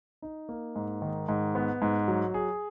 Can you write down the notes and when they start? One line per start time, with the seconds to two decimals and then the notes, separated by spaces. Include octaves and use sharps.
0.22 D#4
0.49 A#3
0.76 G#2
1.02 D#3
1.28 G#2
1.55 B3
1.82 G#2
2.08 F#3
2.34 G#4